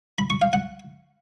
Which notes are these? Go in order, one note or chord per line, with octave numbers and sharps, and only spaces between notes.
B5
C#6
F5
F#5